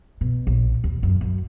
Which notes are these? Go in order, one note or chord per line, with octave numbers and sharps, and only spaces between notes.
B2
A#1
D#2
F#2
F#2